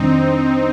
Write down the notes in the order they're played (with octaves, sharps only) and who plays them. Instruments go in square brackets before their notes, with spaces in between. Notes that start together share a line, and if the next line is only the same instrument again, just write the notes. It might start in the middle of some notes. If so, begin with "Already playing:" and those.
Already playing: [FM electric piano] F2 C3 D#3 G3 D4 [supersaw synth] C4 D#4